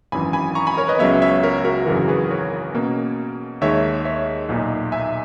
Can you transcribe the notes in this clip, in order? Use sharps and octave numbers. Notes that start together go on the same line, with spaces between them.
G#1 F#2 E3 G#5 B5
G#5 B5
A#5 C#6
G#5 B5
A#4 C#5
B4 D#5
C#2 C#3 F#3 B3 C#5 E5
C#5 E5
A#4 C#5
F#4 A#4
G#1 F#2 C#3 E3 F#4 A#4
G#4 B4
A#4 C#5
B2 A#3 C#4
D#2 D#3 G#3 C#5 E5
C#5 E5
B1 A#2 A#3 D#4
E5 G#5